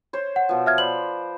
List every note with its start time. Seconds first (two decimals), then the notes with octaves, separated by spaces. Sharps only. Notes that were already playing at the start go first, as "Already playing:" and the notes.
0.13 C5 C#5
0.36 F#5
0.49 B2 F3
0.66 E5 F6 G#6
0.78 B4 C5 D5 F#7